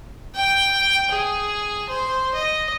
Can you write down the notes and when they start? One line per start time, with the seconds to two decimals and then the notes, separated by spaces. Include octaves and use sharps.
0.36 G5
1.11 G#4
1.90 C5
2.35 D#5